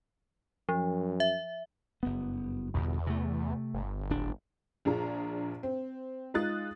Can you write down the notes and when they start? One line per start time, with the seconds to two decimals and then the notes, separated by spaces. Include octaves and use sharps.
0.69 F#2 F3
1.20 E5
2.03 F#1 G2 B3
2.74 G1 E2 B2
3.07 C3 A3
3.74 G1
4.10 D1 D4
4.85 A#1 D4 F4 G#4 A#5
5.63 C4
6.34 G#3 D#4 F4 D#6 F#6 A6